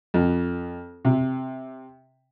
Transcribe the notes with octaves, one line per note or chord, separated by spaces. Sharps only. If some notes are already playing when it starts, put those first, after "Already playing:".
F2
C3